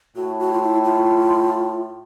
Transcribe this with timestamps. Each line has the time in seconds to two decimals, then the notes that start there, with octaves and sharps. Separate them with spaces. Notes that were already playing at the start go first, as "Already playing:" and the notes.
0.16 A2 F#4
0.40 F#4
0.53 F4
0.62 E4
0.85 F4